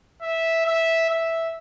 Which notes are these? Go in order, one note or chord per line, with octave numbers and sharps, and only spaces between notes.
E5
E5
E5